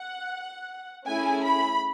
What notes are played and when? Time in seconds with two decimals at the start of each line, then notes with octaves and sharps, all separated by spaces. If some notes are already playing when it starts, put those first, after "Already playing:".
Already playing: F#5
1.07 A3 C#4 E4 G#4 G#5
1.45 B5